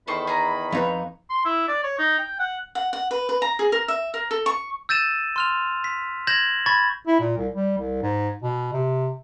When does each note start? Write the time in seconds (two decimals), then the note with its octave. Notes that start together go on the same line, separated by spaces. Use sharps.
0.08 E2 D#3 A4 C5 B5 C#6
0.27 G#4 A#5
0.72 F2 D#4 B4 C#5
1.30 C6
1.45 E4
1.68 D5
1.83 C#5
1.99 D#4
2.18 G5
2.40 F#5
2.75 F#5
2.93 F#5
3.11 B4
3.29 B4
3.42 A#5
3.59 G#4
3.72 A#4
3.88 E5
4.14 A#4
4.31 A4
4.46 C#6
4.89 E6 G6 A6 D#7 E7
5.36 C6 F6 F7
5.84 B6
6.27 G6 G#6 A#6 E7 F#7
6.66 B5 C#6 G#6 A6
7.07 E4
7.20 A#2
7.37 C2
7.52 G3
7.78 C2
8.02 G#2
8.43 B2
8.73 C3